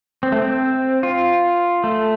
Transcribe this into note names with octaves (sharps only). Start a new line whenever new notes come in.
C4
A3
C4
F4
A3